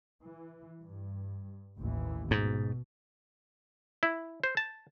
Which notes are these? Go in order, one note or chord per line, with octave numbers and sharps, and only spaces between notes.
E3
G2
A1 D#2 E3
G#2 B2
E4
C5
A5